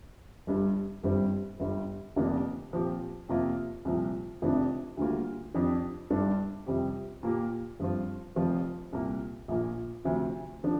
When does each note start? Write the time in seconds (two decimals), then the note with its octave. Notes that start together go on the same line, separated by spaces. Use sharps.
0.47 G1 G2 G3
1.03 G1 G2 G3 C4
1.60 G1 G2 G3
2.16 F1 F2 D3 A#3 D4
2.73 A#2 F3 C4 G4
3.29 F2 C3 A#3 F4
3.85 C2 A#2 F3
4.42 F1 F2 C3 F3 D4
4.97 D2 D3 G3 A#3 F4
5.54 F2 F3 D4 G4
6.10 G1 G2 G3 D4
6.66 F2 C3 G3 C4 G4
7.23 A#2 A#3 G4
7.80 G2 F3 C4 F4
8.36 F1 F2 F3 C4 F4
8.93 C2 A#2 A#3
9.48 A#1 A#2 A#3
10.05 D2 C3 F3
10.63 D3 F3 D4